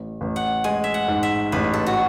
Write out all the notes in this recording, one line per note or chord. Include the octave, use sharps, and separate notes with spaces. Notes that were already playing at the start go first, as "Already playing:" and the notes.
Already playing: A1
A1
F#5
G#3 G#5
E5
F#5
G#2
E5
A1 B4
A4
F#4